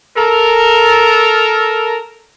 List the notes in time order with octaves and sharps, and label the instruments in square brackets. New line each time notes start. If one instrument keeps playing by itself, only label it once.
[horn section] A4 A#4